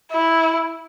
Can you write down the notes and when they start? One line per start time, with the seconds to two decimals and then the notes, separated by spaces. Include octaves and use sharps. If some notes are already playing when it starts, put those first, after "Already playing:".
0.12 E4